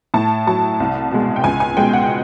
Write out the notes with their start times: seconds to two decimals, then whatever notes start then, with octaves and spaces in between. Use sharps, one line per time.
0.14 A2 A5
0.47 F#3 A5
0.80 C2
1.11 B2 G#3
1.36 G5
1.44 C#2 G#5
1.60 G#5
1.77 B2 G#3 G5
1.93 F#5